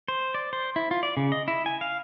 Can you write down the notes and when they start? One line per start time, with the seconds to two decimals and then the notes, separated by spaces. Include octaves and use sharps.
0.08 C5
0.34 D5
0.53 C5
0.76 E4
0.91 F4
1.03 D5
1.17 C#3
1.32 D#5
1.48 E4
1.66 G#5
1.81 F5